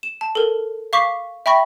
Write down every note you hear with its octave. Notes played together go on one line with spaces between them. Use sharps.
E7
A5
A4 A#4
F5 C#6 D6 B6 C7
E5 G5 B5 C#6 A#6